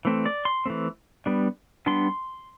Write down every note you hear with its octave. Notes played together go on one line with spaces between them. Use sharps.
E3 A3 C4
D5
C6
E3 A3 C4
G3 B3 D4
G3 B3 D4 C6